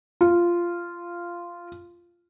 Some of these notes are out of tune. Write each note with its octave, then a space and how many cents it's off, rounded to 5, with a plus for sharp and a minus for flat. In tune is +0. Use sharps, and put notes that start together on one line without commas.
F4 -10